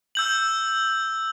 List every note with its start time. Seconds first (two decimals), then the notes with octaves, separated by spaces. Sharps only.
0.15 E6 G6 F#7